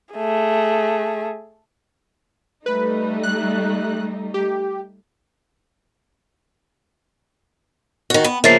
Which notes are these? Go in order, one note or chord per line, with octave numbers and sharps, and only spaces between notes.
A3 G#4
G3 A3 D#4 B4
F#6
G4
D#3 F#4
B3
C#3 F3 A#3 E5 A6 C7